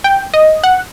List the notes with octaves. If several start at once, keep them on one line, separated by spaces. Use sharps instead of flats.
G5
D#5
F#5